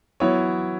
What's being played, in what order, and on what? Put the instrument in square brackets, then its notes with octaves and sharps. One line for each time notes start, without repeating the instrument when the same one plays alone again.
[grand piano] F#3 B3 E4 C#5